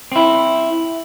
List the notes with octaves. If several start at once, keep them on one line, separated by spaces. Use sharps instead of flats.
C4 E4